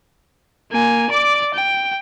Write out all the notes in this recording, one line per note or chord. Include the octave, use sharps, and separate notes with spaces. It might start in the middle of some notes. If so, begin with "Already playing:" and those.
A#3 G#5
D5 D6
G5